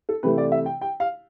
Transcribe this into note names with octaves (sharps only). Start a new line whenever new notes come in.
A4
C3 E3 A3 B4
D5
E5
G5
G5
F5